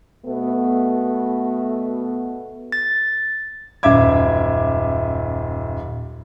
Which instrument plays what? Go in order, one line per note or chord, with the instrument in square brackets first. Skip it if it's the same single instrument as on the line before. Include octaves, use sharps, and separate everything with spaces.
[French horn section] B2 A3 B3
[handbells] A6
[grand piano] D#1 F#2 E5 D6 G#6